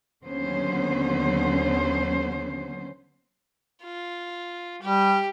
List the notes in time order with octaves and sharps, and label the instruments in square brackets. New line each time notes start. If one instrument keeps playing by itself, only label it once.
[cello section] D#2 D3 F#3 B3 C#4 C5
[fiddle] F4
[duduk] G3 [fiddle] G4